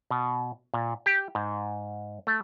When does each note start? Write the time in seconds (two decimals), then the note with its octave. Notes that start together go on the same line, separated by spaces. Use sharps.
0.11 B2
0.74 A#2
1.06 G4
1.35 G#2
2.27 A3